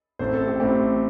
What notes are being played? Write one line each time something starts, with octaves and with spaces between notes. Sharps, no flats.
A1 A2 A3 C4 C5
A4
G4
A1 A2 A3 C4 G4